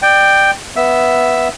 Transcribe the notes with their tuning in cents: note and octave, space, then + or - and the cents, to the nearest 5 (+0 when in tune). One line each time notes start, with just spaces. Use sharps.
D5 +25 G5 +0
B3 +0 E5 +0